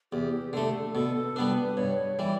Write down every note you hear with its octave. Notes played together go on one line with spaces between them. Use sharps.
E2 G4
D3 A3 A4
B2 A4
G3 B3 D4 B4
G2 C#5
E3 G3 D5